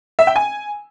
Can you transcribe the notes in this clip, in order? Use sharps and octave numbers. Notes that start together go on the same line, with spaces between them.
E5
G5
G#5